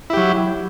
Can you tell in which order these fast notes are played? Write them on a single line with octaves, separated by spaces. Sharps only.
E4 G4 F#3